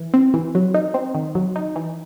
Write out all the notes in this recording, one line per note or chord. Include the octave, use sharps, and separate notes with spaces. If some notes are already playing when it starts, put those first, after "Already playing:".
Already playing: E3
C4
E3
F#3
D#4
C4
D#3
F#3
D#4
E3